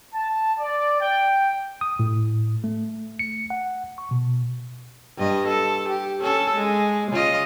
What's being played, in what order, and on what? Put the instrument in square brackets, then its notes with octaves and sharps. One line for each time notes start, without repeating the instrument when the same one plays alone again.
[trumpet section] A5
D5
G5
[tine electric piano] D#6
A2
A3
C#7
F#5
C#6
B2
[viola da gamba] G2 D#5
A4
G4
C#4 A4
G#3
C#3 F4 D#5